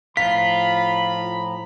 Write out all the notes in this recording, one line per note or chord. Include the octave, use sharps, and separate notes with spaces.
A2 F3 F4 A#5 B5 B6